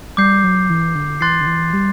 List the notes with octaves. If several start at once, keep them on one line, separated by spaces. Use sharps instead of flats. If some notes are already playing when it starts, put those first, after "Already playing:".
G3 D6 G6 C7
F#3
E3
D3
E3 C6 F#6 A6 C7
D3
E3
G3